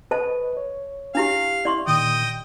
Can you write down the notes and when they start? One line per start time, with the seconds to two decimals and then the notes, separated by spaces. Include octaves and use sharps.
0.11 A4 B4 C5 D#5 A5
0.57 C#5
1.15 D4 E4 G4 F5
1.65 E4 D5 C6 C#6
1.87 A#2 D#3 D#5 G5 D#6